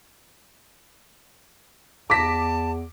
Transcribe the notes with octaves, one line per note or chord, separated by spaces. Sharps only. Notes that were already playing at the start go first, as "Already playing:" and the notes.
E2 A5 D6 A#6 B6